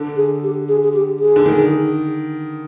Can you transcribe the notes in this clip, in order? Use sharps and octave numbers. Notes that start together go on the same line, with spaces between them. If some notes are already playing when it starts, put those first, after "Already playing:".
Already playing: D3
G#4
G4
G#4
G#4
G4
G#4
D3
D#3